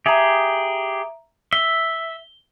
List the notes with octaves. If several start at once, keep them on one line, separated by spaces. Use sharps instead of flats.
G4 G#4 E5 A#5
E5 G7